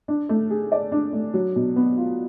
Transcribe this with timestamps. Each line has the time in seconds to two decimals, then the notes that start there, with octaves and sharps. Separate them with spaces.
0.08 D4
0.29 A3
0.50 G#4
0.72 D5
0.92 D4
1.13 A3
1.34 F#3
1.56 B2
1.76 B3
1.98 F4